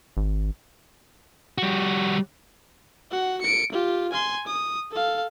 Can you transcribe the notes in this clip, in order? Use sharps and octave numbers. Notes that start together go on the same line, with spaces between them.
G#1
G3 F#4
F#4 F#5
C#7 D7
F4 G4
G#5 C6
D#6
A4 F5